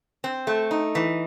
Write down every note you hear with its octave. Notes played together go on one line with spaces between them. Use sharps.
C4
A3
D#4
E3